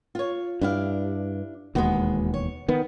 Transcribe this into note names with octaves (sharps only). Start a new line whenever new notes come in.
F4 C#5
G2 D4 E4 F5
E1 D#2 G#3 B3 F#4
C#5
D#3 B3